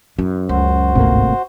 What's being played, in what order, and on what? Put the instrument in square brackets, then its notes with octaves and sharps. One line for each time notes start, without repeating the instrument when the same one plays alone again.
[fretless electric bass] F#2 [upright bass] E4
[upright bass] C#2 [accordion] F#4 C5
[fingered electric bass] G1 G#2 [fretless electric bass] C3 A3 A#3